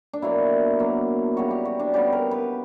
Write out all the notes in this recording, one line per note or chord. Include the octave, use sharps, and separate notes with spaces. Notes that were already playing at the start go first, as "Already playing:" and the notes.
D4
B2 F#3 A#3 E4
B2 F#3 A#3
C#3 G3 B3 F#4
G4
F#4
D4
C#3 G3 B3 G4
A#4
B4